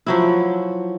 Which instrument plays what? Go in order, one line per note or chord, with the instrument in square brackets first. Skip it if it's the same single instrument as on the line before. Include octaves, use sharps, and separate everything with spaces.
[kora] F3 F#3 E4